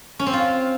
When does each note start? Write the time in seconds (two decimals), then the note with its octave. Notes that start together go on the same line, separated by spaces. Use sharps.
0.19 C#4
0.26 C4
0.33 F4